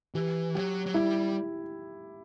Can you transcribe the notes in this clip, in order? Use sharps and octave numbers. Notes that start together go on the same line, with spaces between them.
E3 G4
F#3 G4
F#3
G3 E4